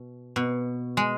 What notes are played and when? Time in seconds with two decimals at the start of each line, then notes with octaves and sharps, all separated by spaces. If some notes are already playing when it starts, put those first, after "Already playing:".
Already playing: B2
0.36 B2
0.97 G#3